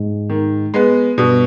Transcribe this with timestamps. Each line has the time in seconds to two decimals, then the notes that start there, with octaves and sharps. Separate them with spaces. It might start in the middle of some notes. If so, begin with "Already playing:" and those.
Already playing: G#2 G#3
0.30 D#3
0.74 G#3 B3
1.18 G2 B2 G3